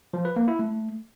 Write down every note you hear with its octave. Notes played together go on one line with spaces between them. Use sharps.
F3
B4
A#3
E4
A3